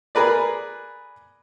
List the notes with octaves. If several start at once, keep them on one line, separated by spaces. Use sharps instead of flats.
G#4 A#4 B4 D5